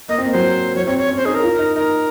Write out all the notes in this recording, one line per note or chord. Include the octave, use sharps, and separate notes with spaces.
A#3 D#5
C4
A#3
F#3 C5
F#3 C#5
C4 C#5
C4 C#5
C#4
C5
D#4 G#4
A#4
F4
D#4
D#4 A#4